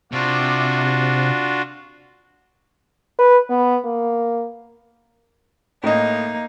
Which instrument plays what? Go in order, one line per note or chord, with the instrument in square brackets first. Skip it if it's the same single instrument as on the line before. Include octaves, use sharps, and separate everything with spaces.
[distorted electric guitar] C3 [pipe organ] D4 F4 F#4
[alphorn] B4
B3
A#3
[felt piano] A2 D#5 [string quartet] A#3 D#4